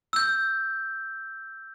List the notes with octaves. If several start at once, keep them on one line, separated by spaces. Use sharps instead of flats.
E6 G6